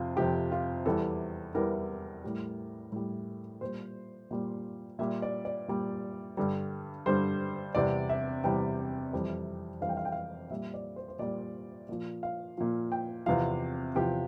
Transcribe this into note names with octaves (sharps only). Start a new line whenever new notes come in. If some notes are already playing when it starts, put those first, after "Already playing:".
Already playing: F2 C3 F4
F2 C3 F3 G4
F4
E2 E3 G3 A4
E2 E3 G3 A#4
A2 G3
A2 G3
A#2 G3 C5
A#2 G3
A#2 G3 E5
D5
D5
A#2 G3
G2 D3 G3
G2 D3 G3 C5
E2 C3 G3 D5
E5
E2 C3 G3 G5
F2 E3 G3
F2 E3 G3 F5
G5
F5
G5
F5
A#2 G3 E5
D5
C5
C5
A#2 G3 D5
A#2 F3
F5
A#2 F3
G5
E2 C3 F3 F5
E2 C3 F3 G4